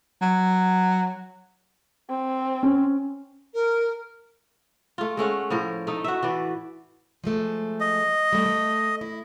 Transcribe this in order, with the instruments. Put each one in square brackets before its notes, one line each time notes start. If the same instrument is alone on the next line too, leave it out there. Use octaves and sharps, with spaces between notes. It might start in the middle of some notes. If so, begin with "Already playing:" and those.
[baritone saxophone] F#3
[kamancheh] C4
[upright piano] C#4
[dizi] A#4
[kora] A3 F4
G#3 A3 C#4 F#5
A2 F3 A#4
A3 D#4
F#4 E5
E3 B4 D5
[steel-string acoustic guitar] F3 G#3 A3
[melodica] D#5
[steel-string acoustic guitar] G3 A3
A3
E4